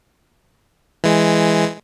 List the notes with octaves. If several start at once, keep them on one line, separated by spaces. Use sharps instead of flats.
E3 G#3